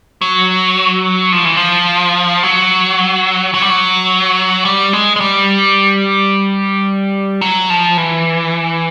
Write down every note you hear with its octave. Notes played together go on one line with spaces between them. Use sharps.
F#3
F3
E3
F3
F#3
F#3
G3
F#3
G3
G#3
G#3
G3
F#3
F3
E3